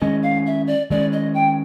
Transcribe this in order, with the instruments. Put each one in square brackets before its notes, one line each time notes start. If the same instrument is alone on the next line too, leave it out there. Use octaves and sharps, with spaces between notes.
[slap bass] D#3 G#3 C#4 [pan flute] D#5
[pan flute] F5
E5
D5
[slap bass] D#3 G#3 C#4 [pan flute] D5
[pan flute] D#5
G5